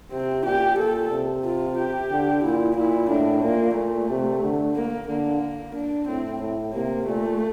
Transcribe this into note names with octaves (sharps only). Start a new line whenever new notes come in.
C3 C4
A#2 G4
A#2 A4
C3
F4
G4
D3
A#2 E4
A#2 E4
A2 D4
A#2 A#3
A#2 A3
C3
D3
A#3
D3 A#3
D4
A2 C4
A2
C3 A#3
A#2 A3